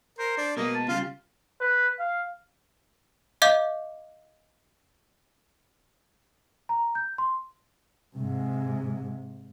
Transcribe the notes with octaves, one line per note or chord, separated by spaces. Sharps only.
A#4 C5
D4
B2 G#3 A#3 B3 D#5
A5
C#3 G3 F4 F5
B4
F5
D#5 F5 D6 G6
A#5
G6
C6
G#2 C3